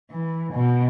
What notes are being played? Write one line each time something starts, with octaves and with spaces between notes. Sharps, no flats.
E3
B2